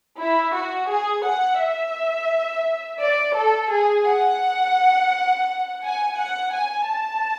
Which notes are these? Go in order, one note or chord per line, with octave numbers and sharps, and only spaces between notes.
E4
F#4
G#4
F#5
E5
D5
A4
G#4
F#5
G#5
F#5
G#5
A5